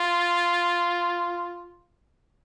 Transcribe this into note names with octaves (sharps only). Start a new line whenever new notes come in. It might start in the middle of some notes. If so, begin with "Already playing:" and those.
Already playing: F4